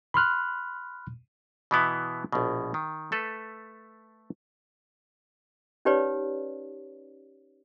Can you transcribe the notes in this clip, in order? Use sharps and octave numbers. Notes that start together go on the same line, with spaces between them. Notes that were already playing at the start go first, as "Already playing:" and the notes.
B5 C6 F6 F#6
B2 E3 B3 E4
A#1 B2
D#3
A3 A4 B4
C#4 D#4 G4 B4 C#5 D5